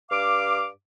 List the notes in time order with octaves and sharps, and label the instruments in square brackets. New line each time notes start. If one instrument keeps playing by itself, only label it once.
[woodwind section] G2 F5 D6